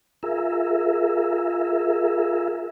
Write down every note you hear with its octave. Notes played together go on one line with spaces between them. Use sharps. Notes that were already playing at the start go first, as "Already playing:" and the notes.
F4 G#4 A#4 E5